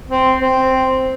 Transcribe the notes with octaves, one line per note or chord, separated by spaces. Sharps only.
C4
C4